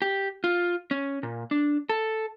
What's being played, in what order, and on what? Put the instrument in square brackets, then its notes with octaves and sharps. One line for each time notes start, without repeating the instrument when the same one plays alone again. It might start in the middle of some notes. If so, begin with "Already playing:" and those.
[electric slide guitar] G4
F4
C#4
A#2
D4
A4